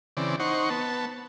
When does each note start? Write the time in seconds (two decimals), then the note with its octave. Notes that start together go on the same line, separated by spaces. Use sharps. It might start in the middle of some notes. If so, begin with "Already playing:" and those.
0.17 C#3 E3 C4 D5
0.40 D#4 C5 F#5 C#6
0.70 B3 A5